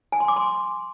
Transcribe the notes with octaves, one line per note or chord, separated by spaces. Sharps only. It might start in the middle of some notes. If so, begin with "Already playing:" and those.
G#5
C6
D6
C6